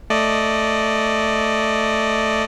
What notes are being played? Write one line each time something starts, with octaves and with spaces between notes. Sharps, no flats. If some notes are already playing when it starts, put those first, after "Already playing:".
A3 D5 D#5